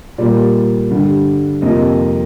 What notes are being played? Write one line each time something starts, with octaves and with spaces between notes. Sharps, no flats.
A#2 G3 A#3 D5
G2 D3 G3
F2 C3 F3 A#3 D#5